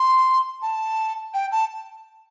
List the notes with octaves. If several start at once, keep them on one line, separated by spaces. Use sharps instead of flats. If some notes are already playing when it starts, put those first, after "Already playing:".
Already playing: C6
A5
G5
A5